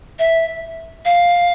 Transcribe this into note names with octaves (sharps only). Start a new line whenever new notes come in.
E5
F5